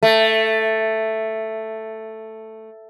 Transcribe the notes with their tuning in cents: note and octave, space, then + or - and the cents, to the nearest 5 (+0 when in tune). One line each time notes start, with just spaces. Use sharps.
A3 +5